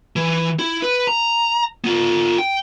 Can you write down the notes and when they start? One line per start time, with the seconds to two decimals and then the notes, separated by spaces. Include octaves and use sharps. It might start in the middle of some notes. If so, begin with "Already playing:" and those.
0.16 E3
0.59 E4
0.82 B4
1.07 A#5
1.84 B3 F4
2.38 G5